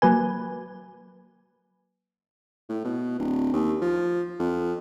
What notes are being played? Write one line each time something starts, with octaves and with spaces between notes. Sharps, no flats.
F#3 A#3 B4 G#5
A2
B2
D1
D#2
F3
F2